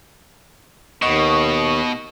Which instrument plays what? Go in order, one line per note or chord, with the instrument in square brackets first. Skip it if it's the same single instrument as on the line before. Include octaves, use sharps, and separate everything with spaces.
[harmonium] D#2 [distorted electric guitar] B2 [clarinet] D#5 [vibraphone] C#6